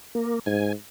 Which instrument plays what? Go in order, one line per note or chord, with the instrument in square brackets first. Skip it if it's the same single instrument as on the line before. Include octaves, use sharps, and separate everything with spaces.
[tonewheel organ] A#3
[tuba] G#2 [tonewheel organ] G#5